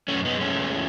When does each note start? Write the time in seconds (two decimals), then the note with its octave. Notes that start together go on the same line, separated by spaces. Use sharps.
0.08 A3 C#4
0.14 F#2
0.25 B3 D#4
0.36 G#3
0.41 A3 C#4
0.58 E2